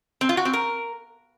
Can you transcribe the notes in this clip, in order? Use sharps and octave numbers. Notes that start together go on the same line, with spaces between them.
C4
F4
F#4
C4
A#4